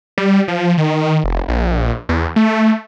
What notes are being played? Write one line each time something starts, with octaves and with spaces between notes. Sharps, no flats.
G3
F3
D#3
F1
A#1
E2
A3